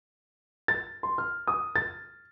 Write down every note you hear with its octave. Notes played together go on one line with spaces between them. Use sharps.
A6
C6
F6
D#6
A6